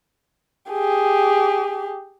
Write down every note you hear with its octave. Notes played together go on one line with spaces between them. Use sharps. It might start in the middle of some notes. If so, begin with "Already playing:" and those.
G4 G#4